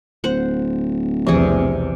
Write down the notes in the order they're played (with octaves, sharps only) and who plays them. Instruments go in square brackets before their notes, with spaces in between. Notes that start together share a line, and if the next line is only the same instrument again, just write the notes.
[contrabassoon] D1 [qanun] C5 F#5
[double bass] B1 E2 [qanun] C3 G#4 [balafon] E3 F3